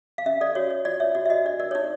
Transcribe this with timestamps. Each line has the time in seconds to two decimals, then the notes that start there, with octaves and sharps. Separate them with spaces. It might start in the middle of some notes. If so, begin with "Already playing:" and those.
0.18 F5
0.26 C#4 E5
0.41 A4 D5
0.55 F#4 C#5
0.70 C#5
0.85 F4 D5
1.00 C#5 E5
1.15 F#4 D5
1.25 E5
1.30 F#4 D#5
1.45 D4 D5
1.60 A#4 D5
1.71 C#5
1.75 D#4 D5